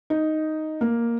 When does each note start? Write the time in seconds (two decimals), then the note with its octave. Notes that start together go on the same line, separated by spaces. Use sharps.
0.10 D#4
0.81 A#3